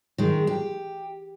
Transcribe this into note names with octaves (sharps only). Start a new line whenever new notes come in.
D#3 G#3
G4